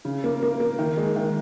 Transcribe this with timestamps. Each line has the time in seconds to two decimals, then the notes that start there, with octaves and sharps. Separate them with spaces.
0.05 C#3
0.24 A#3
0.43 A#3
0.60 A#3
0.79 D#3
0.97 G#3
1.16 D#3